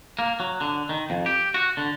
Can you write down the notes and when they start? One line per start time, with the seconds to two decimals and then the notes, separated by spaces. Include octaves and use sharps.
0.19 A#3
0.40 F#3
0.61 D3
0.89 D#3
1.10 F2
1.26 G4
1.54 F#4
1.77 D3